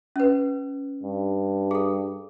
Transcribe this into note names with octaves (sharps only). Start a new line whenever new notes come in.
C#4 B4
G2
G#4 A4